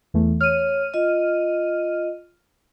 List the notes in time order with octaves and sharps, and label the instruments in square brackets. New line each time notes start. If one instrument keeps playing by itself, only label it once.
[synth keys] E2 E3 A3
[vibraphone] C#5 [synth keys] F6 D#7
[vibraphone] F4 D#5